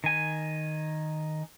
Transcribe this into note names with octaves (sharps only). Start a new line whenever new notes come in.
D#3 G#5